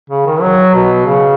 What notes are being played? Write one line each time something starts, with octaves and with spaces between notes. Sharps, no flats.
C#3
D#3
F#3
B2
C#3